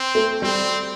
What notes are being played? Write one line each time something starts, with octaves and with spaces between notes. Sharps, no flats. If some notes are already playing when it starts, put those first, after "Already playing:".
Already playing: C4
A3
G3 C4